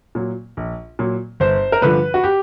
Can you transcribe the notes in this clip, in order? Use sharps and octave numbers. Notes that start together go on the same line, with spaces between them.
A#2 F#3
A#1
A#2 F#3
G1 C5
A#4
G2 D3 F3 B4
F#4
G4